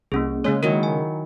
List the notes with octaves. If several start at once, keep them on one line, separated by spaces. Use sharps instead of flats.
C2 A#3 C#4 G#4
C#3 G#3 A#3 C#5
D#3 F#3 E4 A#4
G#5